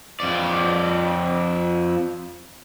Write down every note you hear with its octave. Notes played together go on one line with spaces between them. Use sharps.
F2 D5